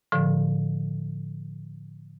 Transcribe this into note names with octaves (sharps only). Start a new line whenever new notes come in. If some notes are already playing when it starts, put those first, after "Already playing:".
A2 D3 F3